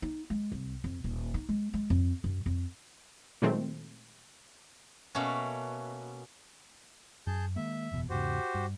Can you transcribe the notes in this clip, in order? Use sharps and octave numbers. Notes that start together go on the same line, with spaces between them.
D#4
G#3
C2
F2
D#1
D#4
G#3
G#3
F2
F#2
F2
A#2 D#3 F#3 G#3 A3 C4
B2 A3 A#3 C#4
F#2 G#4 A5 G6
D#3 G#3 A#3 E5
F#1 E2 B2
E2 G#2 C#3 F#4 G4 C5
G2